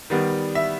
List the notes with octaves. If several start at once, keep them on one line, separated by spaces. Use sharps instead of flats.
D#3 G3 B3
E5